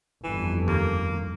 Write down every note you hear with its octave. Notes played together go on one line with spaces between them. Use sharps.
G1 F2 E3
D#2 A#3